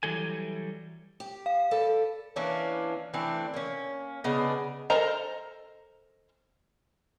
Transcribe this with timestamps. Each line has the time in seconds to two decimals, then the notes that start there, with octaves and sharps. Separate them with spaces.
0.03 E3 F#3 G3 A4 G#5
1.20 G4
1.46 F5
1.71 A4 B4 D5
2.36 E3 A#3 C#4 D4
3.14 E3 A3 C4 D4
3.54 A#3 C#4
4.24 C#3 B3 D4 D#5
4.90 A4 A#4 C5 D#5 A#5